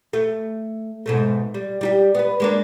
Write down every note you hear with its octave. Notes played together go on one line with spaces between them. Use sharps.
A3
G#2 B2 A3
G3
G3 D#4 G4
B3 B4
G#3 A#3 D4